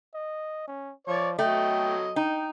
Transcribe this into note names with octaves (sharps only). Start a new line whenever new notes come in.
D#5
C#4
F3 C#5 D5
F#3 A3 D#5 G5
D#4 G5